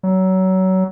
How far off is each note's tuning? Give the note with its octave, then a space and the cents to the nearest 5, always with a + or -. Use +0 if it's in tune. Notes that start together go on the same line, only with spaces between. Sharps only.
F#3 +25